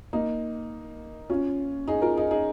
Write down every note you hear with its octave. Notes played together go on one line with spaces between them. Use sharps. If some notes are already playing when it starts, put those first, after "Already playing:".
A#3 D#4
C#4 F4
D#4 G#4
F4 A#4
D#4 G#4
D#4 G#4